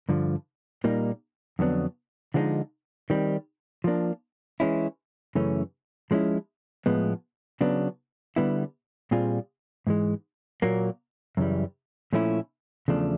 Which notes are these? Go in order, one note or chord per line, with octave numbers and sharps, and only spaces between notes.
G2 D3 F3
A#2 G3 A#3 D#4
F2 D3 F#3 B3 D4
D3 F3 G#3 C4 D#4
D#3 G3 C4
F3 A#3 D4
E3 G#3 C#4 E4
F#2 C#3 E3 A3 C#4
F3 G#3 C#4 E4
A2 F3 G#3 B3
C#3 F#3 B3 D4
D3 G3 B3 E4
A#2 G3 C4 F4 G#4
G#2 E3 G#3
A#2 F#3 A#3
F#2 C#3 E3 G3
A#2 F3 A3 C#4 E4
E2 C#3 F3 A3 D4